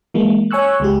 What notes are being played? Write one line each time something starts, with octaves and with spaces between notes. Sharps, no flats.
E3 G#3 A#3
C#5 G#5 C#6 E6 F#6
C#2 G#3 G4